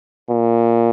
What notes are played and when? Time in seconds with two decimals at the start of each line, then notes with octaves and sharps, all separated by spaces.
0.29 A#2